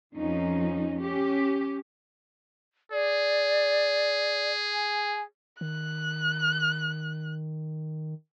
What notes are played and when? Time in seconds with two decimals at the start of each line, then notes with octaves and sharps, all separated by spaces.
0.15 F2 F3 C#4 D#4
1.01 C#4 G4
2.92 G#4 D5
4.73 G#5
5.61 D#3 F#6